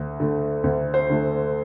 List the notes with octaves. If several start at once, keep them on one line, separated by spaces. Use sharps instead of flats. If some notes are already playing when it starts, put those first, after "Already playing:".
Already playing: D2
D3 A3
D2
C5
D3 A3